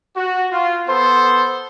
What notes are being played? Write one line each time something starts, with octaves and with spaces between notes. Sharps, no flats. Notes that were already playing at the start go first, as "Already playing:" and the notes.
F#4
F4
B3 A4 C5